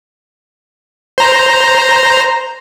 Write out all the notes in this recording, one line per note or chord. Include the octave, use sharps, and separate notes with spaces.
C5 A#5